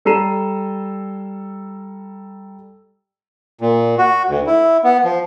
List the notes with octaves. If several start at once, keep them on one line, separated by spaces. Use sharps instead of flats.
G3 A4 A#5 C7 D#7 E7
A#2
F#4
D2
E4
B3
F3